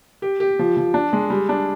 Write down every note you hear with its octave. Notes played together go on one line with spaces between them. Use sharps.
G4
G4
F3
F3
D4
G#3
G3
D4